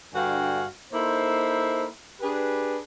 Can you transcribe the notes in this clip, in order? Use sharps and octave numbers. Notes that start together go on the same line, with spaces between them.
G2 D3 F#4 F5 G5 G#5
A#3 D#4 E4 A4 C5
D4 G4 G#4 B4